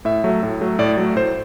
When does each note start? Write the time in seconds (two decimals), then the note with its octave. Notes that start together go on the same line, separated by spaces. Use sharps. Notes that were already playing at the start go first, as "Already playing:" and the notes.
0.05 A2 E5
0.24 F#3 A3
0.43 A2
0.61 F#3 A3
0.79 A2 D5
0.97 F#3 A3
1.16 A2 C5